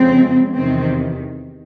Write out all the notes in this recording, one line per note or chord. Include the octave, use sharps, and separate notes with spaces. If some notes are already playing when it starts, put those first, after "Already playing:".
Already playing: F2 C#3 F3 G#3 C4
E2 C3 D#3 C4